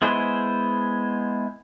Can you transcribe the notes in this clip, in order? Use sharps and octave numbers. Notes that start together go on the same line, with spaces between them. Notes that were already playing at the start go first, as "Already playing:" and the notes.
G#3 B3 E4 G#4 C5